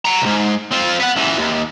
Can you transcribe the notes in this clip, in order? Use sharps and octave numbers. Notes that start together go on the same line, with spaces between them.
F#5 A#5
C2 G#2
C4 F4
B3 F#5
C#2 E3
D#2